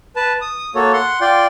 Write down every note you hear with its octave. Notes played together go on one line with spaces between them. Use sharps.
B4 A5
D#6
A#3 F#4 A4 C#5
F#5 C6
F4 D5 G5 C6